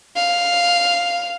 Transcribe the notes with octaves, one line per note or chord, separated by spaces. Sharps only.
F5